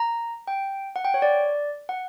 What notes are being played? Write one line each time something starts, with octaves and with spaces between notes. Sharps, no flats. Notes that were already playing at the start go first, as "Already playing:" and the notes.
Already playing: A#5
G5
F#5
G5
C#5
D5
F#5